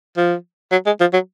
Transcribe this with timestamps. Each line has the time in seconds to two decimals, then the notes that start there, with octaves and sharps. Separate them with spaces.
0.17 F3
0.71 F#3
0.86 G#3
1.00 F3
1.13 F#3